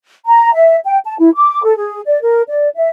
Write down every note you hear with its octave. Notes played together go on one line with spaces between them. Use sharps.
A#5
E5
G5
A5
E4
D6
A4
G#4
D5
A#4
D5
E5